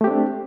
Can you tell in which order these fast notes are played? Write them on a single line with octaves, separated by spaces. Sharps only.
A3 G4 C4 D4